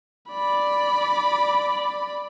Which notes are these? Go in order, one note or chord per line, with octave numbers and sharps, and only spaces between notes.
D5 B5